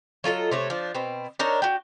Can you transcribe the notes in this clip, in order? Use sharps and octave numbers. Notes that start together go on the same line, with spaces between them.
F#3 F4 A4 D#5
C3 A3 C#5
F3 D4
B2 C4
D4 D#4 A#4 C#5
F#4 G4